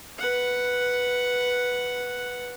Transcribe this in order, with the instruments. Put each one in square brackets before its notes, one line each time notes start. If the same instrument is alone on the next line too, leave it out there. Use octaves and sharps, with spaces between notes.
[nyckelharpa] B4 F#5